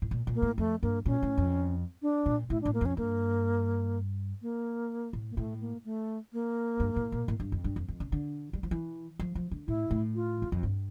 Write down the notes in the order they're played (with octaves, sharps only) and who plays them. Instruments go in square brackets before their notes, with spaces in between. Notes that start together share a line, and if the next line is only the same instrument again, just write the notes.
[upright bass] A2
A#2
A#2
[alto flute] A#3
[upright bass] A2
[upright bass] F2 [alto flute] A3
[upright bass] G2 [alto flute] A#3
[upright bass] A#2 [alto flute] C#4
[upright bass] A2
F2
[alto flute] D4
[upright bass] A#2
[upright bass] A2 [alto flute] E4
[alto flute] D4
[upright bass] A2
[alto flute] A#3
[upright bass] F2 [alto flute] C#4
[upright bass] G2 [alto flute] A#3
[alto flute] A#3
[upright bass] A2
[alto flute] A#3
[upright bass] A2 [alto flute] A3
[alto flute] A#3
A3
A#3
[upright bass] G2
A2
A#2
A2
G2
F2
G2
F2
F2
C#3
D3
G3
F3
E3
F3
F3
D3
[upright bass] A2 [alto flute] E4
[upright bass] A2
[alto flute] F4
[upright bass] E2
F2
G2